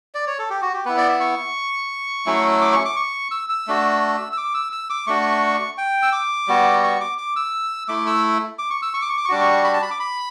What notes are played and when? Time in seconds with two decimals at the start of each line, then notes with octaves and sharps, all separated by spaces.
0.15 D5
0.27 C#5
0.39 A4
0.50 G4
0.62 F#4
0.74 G4
0.85 B3 E4 B4
0.97 D5
1.09 E5
1.20 C#6
2.26 F#3 A3 C#4 E4
2.61 D6
2.73 C#6
2.85 D6
2.96 C#6
3.31 E6
3.50 E6
3.67 A3 D4 F#4
4.33 E6
4.37 D6
4.54 E6
4.72 E6
4.90 D6
5.07 A3 D4 F#4 C#6
5.78 G5
6.03 E6
6.12 D6
6.48 G3 B3 F#4
6.83 C#6
7.00 D6
7.18 D6
7.36 E6
7.88 A3 E4 D6
8.07 E6
8.59 D6
8.70 C#6
8.82 E6
8.94 C#6
9.02 D6
9.09 C#6
9.18 D6
9.25 C#6
9.29 G3 D4 F#4 D6
9.41 C#6
9.64 B5
9.73 A5
9.82 B5
9.91 D6
9.99 B5